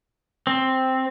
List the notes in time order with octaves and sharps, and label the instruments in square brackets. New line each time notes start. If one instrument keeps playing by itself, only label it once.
[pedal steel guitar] C4